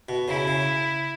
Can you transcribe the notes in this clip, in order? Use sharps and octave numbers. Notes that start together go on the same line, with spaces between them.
B2
C#3 E4
C#3